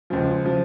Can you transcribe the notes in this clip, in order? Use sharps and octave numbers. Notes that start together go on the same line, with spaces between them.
C#2 C#3 F3
C#3 F3